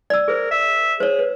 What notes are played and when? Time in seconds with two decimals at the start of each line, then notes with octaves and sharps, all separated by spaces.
0.10 D5 E6
0.28 G#4 A#4 C5
0.51 E5
1.00 G#4 C5 C#5
1.19 B4